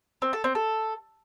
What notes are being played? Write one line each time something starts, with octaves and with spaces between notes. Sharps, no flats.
C4
A4
C4
A4